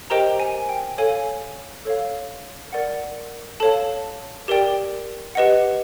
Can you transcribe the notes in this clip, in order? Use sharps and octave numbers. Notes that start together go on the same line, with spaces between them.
G4 A#4 C5 D#5 G5 A#5
G#5
G5
A4 C#5 F5 G#5
A4 C#5 F5
A#4 D5 F#5
A4 C#5 F5 A5
G4 A#4 D5 G5
G4 B4 D#5 F#5